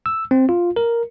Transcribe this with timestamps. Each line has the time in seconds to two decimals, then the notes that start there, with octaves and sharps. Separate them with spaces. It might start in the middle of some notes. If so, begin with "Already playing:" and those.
0.06 E6
0.31 C4
0.49 F4
0.76 A#4